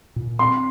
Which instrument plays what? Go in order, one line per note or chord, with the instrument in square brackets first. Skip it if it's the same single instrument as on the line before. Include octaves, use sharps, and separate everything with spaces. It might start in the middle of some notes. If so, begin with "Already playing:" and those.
[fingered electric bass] A#2
[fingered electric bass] C4 [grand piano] C6